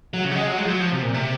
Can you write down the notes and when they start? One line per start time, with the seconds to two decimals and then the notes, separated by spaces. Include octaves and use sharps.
0.14 F#3
0.25 C#3
0.31 F#3
0.36 G#3
0.47 F#3
0.58 G#3
0.65 F3
0.69 F#3
0.80 F3
0.92 C3
1.03 A#2
1.14 C3